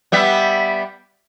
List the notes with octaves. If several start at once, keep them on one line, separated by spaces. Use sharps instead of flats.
G3 B3 E5